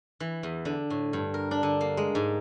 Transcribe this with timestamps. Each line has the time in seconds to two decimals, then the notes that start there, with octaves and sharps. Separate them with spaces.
0.20 E3
0.43 E2
0.65 D3
0.90 A2
1.13 G2
1.34 A#4
1.51 D4
1.63 D3
1.81 A#3
1.97 G#3
2.15 G#2